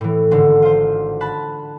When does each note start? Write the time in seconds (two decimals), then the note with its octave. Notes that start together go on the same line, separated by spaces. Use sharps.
0.01 A2 E3
0.31 G#1 D3
0.62 F4 C5
1.20 A5 B5 F#6